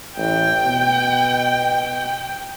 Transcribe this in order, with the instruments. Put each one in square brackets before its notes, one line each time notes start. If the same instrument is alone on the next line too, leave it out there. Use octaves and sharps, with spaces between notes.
[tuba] A1 [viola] G5
[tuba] B2